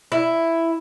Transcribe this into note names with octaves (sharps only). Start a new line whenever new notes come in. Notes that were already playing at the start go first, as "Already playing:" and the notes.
E4